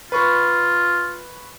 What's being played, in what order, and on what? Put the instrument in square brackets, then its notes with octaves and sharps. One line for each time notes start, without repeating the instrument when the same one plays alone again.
[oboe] F4 [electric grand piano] B4 C#6